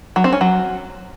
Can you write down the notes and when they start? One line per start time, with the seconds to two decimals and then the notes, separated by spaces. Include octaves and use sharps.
0.16 F#3
0.24 C4
0.33 C#4
0.41 F#3